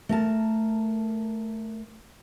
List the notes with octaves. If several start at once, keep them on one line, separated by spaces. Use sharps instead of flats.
A3 A#4 A5